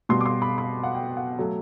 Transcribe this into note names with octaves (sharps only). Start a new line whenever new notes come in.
B2 G3 B3 C6
D6
C6
B5
B5
F#5
G5
F#5
F#3 A3